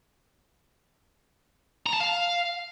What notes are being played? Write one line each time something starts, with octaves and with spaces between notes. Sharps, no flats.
A#5
A5
F5